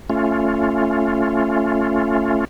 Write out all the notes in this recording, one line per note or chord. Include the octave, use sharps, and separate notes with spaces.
A3 C#4 F4